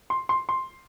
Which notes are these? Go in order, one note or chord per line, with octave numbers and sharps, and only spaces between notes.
C6
C6
C6